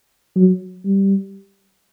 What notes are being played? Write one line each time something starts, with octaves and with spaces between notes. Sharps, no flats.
F#3
G3